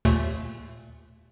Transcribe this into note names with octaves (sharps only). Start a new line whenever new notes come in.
D#2 A#2 A3